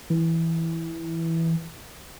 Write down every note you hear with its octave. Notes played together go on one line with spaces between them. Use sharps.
E3